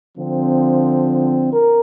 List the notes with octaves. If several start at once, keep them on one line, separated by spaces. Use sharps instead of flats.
D3 F3 C4
A#4